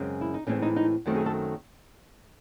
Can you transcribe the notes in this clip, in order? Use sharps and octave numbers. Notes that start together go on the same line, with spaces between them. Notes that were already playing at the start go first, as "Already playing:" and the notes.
Already playing: F#2 C#3 G#3 C4
E4
D#4
A2 E3 G#3 C4 C#4
D#4
D#4
F#2 D#3 F#3 A3 C4
G#4
A4